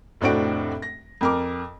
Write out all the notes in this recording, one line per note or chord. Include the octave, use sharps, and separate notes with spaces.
F1 A2 C4 D4 F#4 D7
A#6
F2 A#4 D6